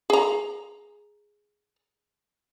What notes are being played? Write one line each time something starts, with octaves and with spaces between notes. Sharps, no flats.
G#4 A#5